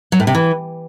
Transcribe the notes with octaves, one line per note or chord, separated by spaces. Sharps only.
F#3
A2
C3
E3